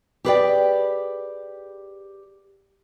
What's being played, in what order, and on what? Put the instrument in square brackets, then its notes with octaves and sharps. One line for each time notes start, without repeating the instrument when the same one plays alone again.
[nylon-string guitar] G4 G#4 B4 C#5 D5 G5